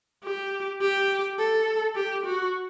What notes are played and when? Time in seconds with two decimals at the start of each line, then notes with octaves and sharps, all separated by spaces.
0.24 G4
0.81 G4
1.38 A4
1.95 G4
2.25 F#4